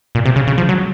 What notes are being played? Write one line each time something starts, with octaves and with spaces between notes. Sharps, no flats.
A#2
C3
C#3
C#3
F3
F#3